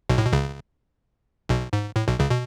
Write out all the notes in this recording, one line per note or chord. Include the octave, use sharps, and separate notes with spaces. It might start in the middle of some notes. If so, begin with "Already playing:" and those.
B1 B2
A2
B2
C#2 C#3
B1 B2
G#2
A2
B1 B2
C#2 C#3
B2